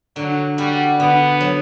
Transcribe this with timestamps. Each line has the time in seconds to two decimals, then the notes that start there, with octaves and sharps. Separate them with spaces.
0.16 D3 F#3
0.58 G3 F#4
0.99 D3 B3
1.41 F#3